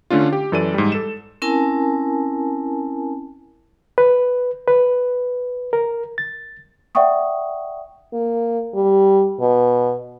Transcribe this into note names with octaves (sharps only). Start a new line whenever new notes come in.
D3 A3 C#4 D4 F4
G4
F#2 E3 A4 D5 D#7
G#2 G3
A4 E7
C4 C#4 E4 A#4 G#5 A5
B4
B4
A#4
A6
D5 E5 F#5 G5 C#6 D#6
A#3
G3
B2